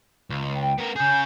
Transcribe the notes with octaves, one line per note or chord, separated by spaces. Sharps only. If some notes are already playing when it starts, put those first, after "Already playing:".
C#2
G5
B3 A#4
C#3 G#4 G#5 G6